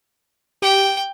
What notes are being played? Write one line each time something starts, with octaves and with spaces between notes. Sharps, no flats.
G4 G5